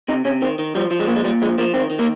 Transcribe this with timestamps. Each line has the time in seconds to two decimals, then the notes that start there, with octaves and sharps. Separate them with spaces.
0.08 C3 D#4
0.25 C3 C#4
0.42 D#3 C4
0.59 D#3
0.75 F3 G3
0.91 F3
1.00 G#3
1.07 A#2 A#3
1.16 G#3
1.24 A#2 G3
1.42 F3 G#3
1.58 F3 A#3
1.74 D#3 C4
1.90 D#3
1.99 A#3